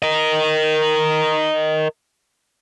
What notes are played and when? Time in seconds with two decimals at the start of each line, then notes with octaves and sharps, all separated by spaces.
0.03 A#4 D#5